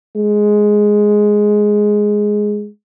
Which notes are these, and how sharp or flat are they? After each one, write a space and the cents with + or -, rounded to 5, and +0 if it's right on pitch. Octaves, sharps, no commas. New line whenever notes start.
G#3 +5